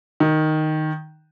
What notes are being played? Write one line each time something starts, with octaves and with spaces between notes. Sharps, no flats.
D#3